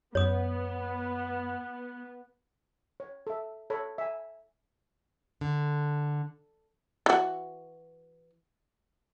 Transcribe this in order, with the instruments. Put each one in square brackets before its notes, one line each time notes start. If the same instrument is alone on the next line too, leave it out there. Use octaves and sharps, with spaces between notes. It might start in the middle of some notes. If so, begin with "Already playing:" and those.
[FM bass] F#2 [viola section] B3 [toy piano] C#5 D#6
[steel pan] C#5
A4 E5
A4 C#5 B5
E5 G#5
[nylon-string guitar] D3
[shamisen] E3 F#4